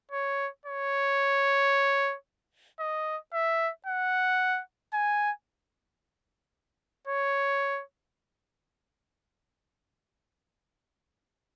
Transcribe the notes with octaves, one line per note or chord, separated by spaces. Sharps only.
C#5
C#5
D#5
E5
F#5
G#5
C#5